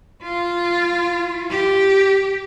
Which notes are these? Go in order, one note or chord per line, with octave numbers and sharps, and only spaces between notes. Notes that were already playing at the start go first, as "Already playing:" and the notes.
F4
G4